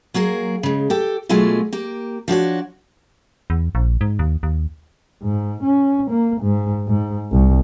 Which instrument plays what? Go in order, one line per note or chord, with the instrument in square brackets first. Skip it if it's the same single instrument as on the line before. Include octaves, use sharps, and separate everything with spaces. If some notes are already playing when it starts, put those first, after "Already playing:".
[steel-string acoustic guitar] F#3 A#3 G#4 A#4
C#3 G#3
G4 A4 G5
B2 F#3 G#3 A3 F4 G#5
A#3 G4
F3 D4 F#4 C#5
[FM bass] E2
A#1
G#2
D#2
D#2
[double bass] G#2
C#4
A#3
G#2
G#2
C2